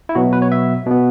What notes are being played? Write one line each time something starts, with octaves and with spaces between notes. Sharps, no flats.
E4
B2 F#3 B3 F#4
B4
C#5
E5
B2 B3